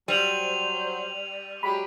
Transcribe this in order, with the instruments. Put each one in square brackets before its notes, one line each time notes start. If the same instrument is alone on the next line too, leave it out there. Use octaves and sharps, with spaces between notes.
[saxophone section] F#3 C5 [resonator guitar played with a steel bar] G3 [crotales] D#7 F7 F#7
[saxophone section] F#3 G#3 G4 [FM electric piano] B5